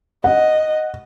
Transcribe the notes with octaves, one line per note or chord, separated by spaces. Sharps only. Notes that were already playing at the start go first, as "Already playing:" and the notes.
D#5 F#5